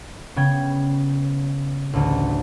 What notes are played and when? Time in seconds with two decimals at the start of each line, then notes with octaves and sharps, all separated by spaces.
0.36 C#3 B3 G5 G#6
1.93 A1 D2